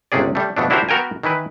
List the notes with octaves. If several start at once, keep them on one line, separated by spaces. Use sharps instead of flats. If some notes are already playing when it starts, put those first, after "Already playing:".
G1 C#2 C3 C#4 G#4 D5
G3 A3
F2 B2 A3 D4
D4 E4 F#4 G4 A#4 C5
B3 F#4 A#4 G5 G#5
D#3 E3 E4 B4